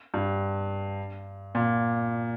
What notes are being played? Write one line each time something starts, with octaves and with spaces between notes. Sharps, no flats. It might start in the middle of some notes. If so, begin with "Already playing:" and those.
G2
A#2